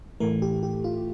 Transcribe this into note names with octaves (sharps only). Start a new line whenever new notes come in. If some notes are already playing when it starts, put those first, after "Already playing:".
A2 E3 A3 A#4
G4
G4
F4